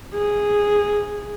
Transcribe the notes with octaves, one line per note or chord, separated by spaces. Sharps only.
G#4